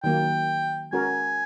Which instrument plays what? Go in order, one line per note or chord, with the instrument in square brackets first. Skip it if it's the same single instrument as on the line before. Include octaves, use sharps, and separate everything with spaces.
[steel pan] D#3 F#3 A#3 [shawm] G5
[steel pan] G#3 C#4 F#4 A#4 [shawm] G#5